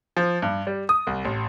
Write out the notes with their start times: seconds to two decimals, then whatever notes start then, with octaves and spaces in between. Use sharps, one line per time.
0.17 F3
0.42 G2
0.67 G3
0.89 D#6
1.07 C2
1.25 A1